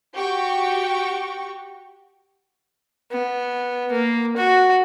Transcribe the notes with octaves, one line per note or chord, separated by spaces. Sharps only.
F#4 G4 G5 C#6
B3
A#3
F#4